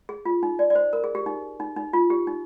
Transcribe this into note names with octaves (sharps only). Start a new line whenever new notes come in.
G#4
F4
D#4
D5
D5
C5
A#4
G#4
G4
D#4
D#4
D#4
F4
G4
D#4